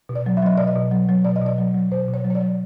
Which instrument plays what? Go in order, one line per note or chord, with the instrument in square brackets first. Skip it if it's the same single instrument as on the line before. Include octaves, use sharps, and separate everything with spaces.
[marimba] B2
D5
F#3
E5
F#3 D#5
B2 D5
D#5
B2
F#3
F#3
B2 D5
D#5
B2 D5
F#3
F#3
B2 C5
B2
C#5
F#3
C#5
D5
F#3